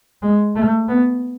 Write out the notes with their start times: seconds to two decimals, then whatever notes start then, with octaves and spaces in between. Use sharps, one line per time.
0.22 G#3
0.55 A3
0.89 B3